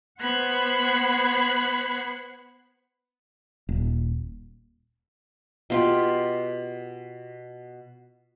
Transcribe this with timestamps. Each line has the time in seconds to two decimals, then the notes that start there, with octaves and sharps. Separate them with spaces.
0.20 B3 C5 F#5 B5 F#6 G#6
3.69 D#1
5.70 B2 F4 G4